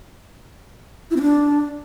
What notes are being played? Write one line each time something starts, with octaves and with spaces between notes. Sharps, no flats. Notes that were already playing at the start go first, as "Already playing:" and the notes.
E4
C4
D4